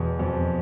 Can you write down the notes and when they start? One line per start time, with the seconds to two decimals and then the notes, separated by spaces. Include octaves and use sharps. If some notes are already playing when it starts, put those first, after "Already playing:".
Already playing: E2 B2
0.19 F2